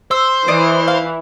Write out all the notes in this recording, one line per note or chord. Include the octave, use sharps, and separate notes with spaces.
C5 E6
E3 E4 D5 D#5 D#6
F5